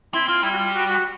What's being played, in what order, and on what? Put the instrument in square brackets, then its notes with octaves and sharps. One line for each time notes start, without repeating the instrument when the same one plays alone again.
[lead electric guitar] C4 [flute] E4
[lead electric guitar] C4 [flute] F4
[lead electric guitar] G3 [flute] E4
[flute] F#4
F4
F#4
F#4